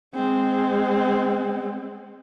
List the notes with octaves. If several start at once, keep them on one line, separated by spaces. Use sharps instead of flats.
G#3 C4